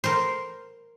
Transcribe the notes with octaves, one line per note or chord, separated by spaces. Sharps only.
A#4 C5